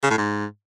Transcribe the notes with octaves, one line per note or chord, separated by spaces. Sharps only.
C#3
A2
G#2